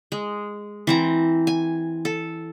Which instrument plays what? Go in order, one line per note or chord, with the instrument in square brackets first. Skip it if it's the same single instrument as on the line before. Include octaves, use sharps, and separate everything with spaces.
[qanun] G#3
E3 C4 A#5
G#5
A4